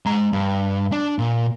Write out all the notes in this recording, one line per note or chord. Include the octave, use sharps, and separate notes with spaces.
G#3 A#5
G2
D4
A#2